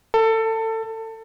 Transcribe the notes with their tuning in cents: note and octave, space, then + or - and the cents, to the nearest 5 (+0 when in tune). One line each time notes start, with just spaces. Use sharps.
A4 +25